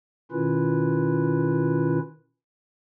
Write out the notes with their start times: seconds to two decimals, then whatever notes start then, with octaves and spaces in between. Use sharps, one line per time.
0.31 B2 D#3 C#4 E4 F4 B4